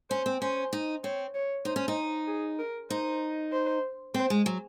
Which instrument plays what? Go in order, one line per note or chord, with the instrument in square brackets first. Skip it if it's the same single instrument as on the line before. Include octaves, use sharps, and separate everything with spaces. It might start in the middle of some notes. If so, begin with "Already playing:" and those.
[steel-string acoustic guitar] C#4 [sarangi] C5
[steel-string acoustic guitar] C4
[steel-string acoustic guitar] C#4 [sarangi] C5
[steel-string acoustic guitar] D#4
[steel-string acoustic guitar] C4 [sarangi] C#5
[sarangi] C#5
[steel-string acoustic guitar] D#4 [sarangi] C5
[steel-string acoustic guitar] C#4
D#4
[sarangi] G#4
A#4
[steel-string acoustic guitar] D#4 [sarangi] C5
[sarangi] C5
[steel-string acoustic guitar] C4 [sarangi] C5
[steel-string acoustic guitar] G#3
F#3